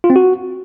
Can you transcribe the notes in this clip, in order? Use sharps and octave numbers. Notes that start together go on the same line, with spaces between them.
F4
C4
F#4